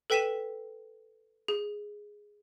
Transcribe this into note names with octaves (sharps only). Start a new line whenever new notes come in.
A4 B4 G5 B6 D#7 E7
G#4